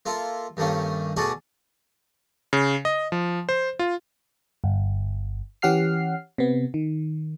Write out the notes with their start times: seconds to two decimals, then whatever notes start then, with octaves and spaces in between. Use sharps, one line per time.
0.06 A#3 F4 A4 E5
0.57 G2 D#3 A3 A#3 C#4
1.17 B2 A3 F#4 G#4 D5 A5
2.53 C#3
2.85 D#5
3.12 F3
3.49 C5
3.79 F4
4.64 G1
5.62 E3 C#4 G4 F#5 F6 C7
6.38 C3 B3
6.74 D#3